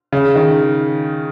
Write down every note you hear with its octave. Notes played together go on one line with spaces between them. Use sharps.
C#3
D#3